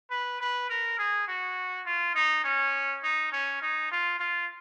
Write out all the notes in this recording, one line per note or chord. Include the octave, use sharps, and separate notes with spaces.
B4
B4
A#4
G#4
F#4
F4
D#4
C#4
D#4
C#4
D#4
F4
F4